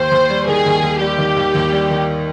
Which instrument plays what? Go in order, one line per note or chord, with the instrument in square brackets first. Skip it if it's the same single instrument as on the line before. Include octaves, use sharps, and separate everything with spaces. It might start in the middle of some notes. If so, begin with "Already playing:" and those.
Already playing: [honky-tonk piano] D#2 [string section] C5
[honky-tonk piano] D#2
G3
[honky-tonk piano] D#3 [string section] G#4
[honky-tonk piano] D#2
D#2
[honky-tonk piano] G3 [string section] G4
[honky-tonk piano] D#3
D#2
D#2
G3
D#3